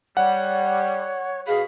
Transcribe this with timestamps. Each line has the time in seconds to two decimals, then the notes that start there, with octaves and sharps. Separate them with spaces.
0.17 G3 C#5 F#5
1.47 B2 F#4 G#4 F5 B5